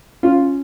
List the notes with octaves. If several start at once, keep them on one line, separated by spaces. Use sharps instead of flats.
C#4 F4